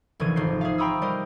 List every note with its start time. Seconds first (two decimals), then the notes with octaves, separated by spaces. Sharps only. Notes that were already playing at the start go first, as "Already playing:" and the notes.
0.20 F1 A#1 E3 G#6 D#7
0.36 G#1 D#4 C5 C7
0.61 G#4 E5 F5
0.78 G5 A#5 B5 C#6 D#6 E6
1.02 G3 A#4 C5 D#5